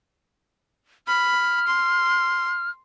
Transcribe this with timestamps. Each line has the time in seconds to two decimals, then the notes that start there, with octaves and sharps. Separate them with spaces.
1.07 B5 F6
1.67 C6